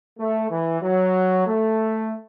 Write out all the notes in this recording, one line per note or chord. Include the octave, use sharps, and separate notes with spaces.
A3
E3
F#3
A3